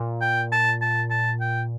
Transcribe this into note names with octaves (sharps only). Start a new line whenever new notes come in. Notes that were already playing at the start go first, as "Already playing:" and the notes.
Already playing: A#2
G5
A5
A5
A5
G5